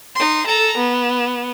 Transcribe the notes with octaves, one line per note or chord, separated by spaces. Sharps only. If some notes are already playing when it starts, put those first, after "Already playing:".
D#4 C6
A4 A#5
B3